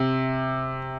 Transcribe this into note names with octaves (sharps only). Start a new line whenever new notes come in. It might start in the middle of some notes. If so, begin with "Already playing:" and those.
Already playing: C3